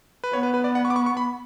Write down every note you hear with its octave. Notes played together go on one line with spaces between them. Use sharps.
B4
B3 C#5
B4
B4
D5
F#5
C#6
D6
C#6
C#6
B5